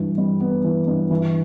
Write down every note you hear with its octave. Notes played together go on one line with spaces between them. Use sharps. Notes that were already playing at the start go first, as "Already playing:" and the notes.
Already playing: G2 E3
G3
B3
E3
G2
E3